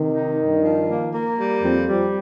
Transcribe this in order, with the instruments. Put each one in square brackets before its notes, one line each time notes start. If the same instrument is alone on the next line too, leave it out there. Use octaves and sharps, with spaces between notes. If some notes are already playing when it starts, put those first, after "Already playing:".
Already playing: [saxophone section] C3 [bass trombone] D#3
[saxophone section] D#4
G2
F3
A#3
A#3
G3
[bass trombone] F2 [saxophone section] C4
[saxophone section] G3